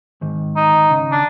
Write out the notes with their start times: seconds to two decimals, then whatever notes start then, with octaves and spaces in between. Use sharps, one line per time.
0.21 G#2 D#3
0.56 D#4
0.91 C#3
1.12 D4